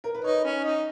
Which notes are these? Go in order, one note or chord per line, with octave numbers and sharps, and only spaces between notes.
A#4
B4
D#4 C#5
C#4
D#4 D#5